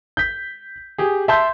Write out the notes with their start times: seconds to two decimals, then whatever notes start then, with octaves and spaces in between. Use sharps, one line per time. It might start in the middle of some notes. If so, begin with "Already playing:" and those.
0.17 G6 B6
0.98 G4 G#4
1.28 E5 A5 C6 G6